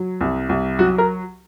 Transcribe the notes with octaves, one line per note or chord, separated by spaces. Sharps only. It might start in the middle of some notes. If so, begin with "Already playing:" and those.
Already playing: F#3
C2
C2
F#3 F#4
A#4